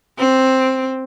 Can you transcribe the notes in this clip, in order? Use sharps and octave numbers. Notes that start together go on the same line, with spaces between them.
C4